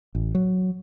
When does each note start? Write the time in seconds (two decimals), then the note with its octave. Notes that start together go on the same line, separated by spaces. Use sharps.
0.15 A1
0.35 F#3